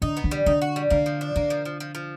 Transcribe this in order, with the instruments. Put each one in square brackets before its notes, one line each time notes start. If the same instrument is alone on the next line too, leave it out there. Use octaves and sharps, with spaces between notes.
[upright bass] D3 [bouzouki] D#4
[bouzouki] B3
[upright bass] D3
[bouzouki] G3
[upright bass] D3 [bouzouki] D#4
[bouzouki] F#4
G3
[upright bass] D3 [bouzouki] A#3
[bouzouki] F3
D4
[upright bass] D3 [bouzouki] A#3
[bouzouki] F3
F3
F3
F3